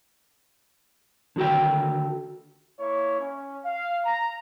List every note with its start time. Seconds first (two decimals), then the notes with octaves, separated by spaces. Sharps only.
1.36 D3 D#3 F#4 A4 G5
2.80 A#3 E4 C#5
3.20 C#4
3.64 F5
4.05 A#5